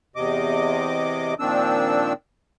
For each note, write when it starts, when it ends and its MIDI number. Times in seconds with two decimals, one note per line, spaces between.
0.16 1.34 40
0.16 1.34 48
0.16 1.34 75
0.16 1.34 86
1.39 2.13 46
1.39 2.13 51
1.39 2.13 53
1.39 2.13 60
1.39 2.13 62
1.39 2.13 88